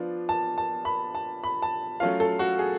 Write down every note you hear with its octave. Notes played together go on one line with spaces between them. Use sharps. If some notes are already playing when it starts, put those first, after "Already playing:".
Already playing: F3 B3 D4 F4
A5
A5
B5
A5
B5
A5
F#3 A3 C#4 F4 F5
A4
F#4
G#4